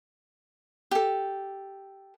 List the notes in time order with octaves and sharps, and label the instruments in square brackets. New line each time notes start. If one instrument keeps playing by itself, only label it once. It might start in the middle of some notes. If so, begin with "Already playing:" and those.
[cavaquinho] G4 A4